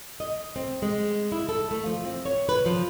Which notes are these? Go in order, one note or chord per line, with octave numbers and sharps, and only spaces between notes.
D#5
C4
G#3
E4
A4
A3
F3
C4
C#5
B4
F3